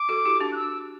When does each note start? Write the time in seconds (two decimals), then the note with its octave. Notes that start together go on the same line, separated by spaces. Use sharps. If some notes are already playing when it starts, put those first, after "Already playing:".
Already playing: D6
0.09 F#4 A4
0.25 E4 G4
0.40 D4 F#4
0.52 F#6
0.56 E6